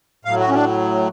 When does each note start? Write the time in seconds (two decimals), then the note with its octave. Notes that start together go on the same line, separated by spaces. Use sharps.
0.25 A2 F#3 F5
0.40 F#4
0.48 C#4
0.54 D4